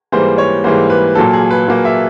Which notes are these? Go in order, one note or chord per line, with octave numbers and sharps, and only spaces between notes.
G#2 E3 G3 A#3 C5
C#5
G#2 E3 G3 A#3 C5
B4
A#2 F#3 A#3 A4
G#4
B4
A#2 F#3 A#3
E5